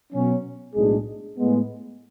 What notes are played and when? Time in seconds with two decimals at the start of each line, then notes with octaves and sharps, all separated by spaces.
0.13 B2 F#3 C#4
0.74 B1 A2 G#3 D4 G#4
1.36 A2 G#3 B3